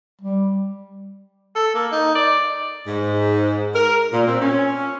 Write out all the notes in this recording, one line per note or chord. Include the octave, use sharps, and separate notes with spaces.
G3
A4
A#3
D#4
D5
G#2
A#4
A#2
C4
C#4